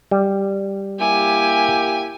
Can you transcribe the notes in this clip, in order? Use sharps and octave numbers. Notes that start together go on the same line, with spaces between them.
G3
A#3 E4 G4 G#5